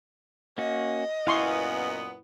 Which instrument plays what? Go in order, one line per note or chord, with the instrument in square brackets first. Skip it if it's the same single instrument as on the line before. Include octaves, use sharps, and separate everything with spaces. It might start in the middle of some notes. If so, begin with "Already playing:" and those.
[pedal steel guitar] A#3 C#4 F#4 [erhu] D#5
[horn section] F#2 A#2 B3 [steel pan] E4 C6 C#6 [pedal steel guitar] F5 G#5